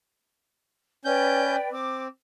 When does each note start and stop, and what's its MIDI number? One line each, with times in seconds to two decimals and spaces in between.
1.05 1.56 61
1.05 1.71 71
1.05 1.71 74
1.05 1.71 79
1.05 1.56 91
1.72 2.08 60
1.72 2.05 86